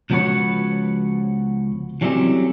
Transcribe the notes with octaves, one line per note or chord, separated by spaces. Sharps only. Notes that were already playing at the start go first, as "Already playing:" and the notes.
C#2 F3 B3 F#4 B4 C#5
E3 F#3 G3 A3 C4 C#4